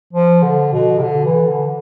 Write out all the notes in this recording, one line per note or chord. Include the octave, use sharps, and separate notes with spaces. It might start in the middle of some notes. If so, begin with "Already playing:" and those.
F3
D3
B2
C3
D3
E3
D3